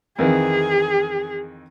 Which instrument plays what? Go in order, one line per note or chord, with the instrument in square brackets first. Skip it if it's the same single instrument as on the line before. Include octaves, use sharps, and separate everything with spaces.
[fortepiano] F2 D#3 E3 [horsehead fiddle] G#4